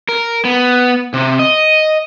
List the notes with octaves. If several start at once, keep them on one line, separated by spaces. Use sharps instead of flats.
A#4
B3
C3
D#5